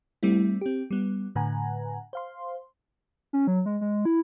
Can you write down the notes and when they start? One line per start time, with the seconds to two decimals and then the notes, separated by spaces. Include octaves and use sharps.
0.23 G3 A3 C4 E4
0.61 C4 G4
0.91 G3 B3
1.35 A2 D3 B4 F#5 G#5 A#5
2.13 C5 F5 C6
3.33 C#4
3.47 F#3
3.66 G#3
3.81 G#3
4.05 E4